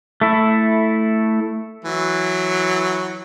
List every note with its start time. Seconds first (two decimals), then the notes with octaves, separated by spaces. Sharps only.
0.21 A3 E4
1.84 E3 F#3